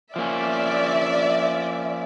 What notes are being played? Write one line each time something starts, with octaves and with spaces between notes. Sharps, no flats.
F3 A#3 C#4 D5 E5